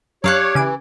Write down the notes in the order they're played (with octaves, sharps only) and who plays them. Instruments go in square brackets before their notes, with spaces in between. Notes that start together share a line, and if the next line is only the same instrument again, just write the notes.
[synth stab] F#2 [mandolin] D4 F5 F#6 [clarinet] G4 [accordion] C#5
[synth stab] C#3 G#5 D6 [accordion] E3